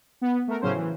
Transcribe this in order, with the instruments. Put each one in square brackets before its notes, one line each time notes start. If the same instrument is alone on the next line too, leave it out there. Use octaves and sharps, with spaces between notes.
[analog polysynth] B3
A3 A#4
A2 C#3 F#3 C#4 C5
E3